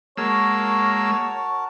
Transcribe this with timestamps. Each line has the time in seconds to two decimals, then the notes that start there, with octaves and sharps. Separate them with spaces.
0.18 G#3 A#3 F#4 A#4 C#5 A5 E6